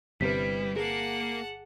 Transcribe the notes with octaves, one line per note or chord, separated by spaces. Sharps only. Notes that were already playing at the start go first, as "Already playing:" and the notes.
G1 C3 G3 E4 B4 B6
A#3 G#4 A#4 F#5 A5